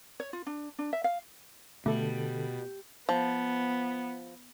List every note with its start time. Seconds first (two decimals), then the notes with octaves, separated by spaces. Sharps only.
0.20 C#5
0.33 F4
0.47 D4
0.79 D4
0.93 E5
1.04 F5
1.86 B2 D3 G3 A3 A4
3.09 F3 B3